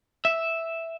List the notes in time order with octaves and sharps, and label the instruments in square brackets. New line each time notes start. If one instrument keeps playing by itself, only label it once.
[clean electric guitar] E5